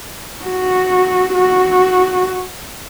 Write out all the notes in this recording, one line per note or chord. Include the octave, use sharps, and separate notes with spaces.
F#4
F#4